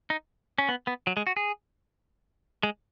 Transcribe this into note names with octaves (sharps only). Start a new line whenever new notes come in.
D#4
C#4
B3
B3
F#3
G#3
F#4
G#4
G#3